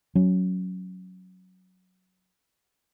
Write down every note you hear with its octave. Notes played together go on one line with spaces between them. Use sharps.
F#3 C#4